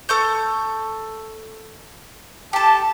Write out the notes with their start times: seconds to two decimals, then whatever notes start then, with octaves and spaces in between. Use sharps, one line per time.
0.09 A4 C#6 G6
2.53 G4 A4 A5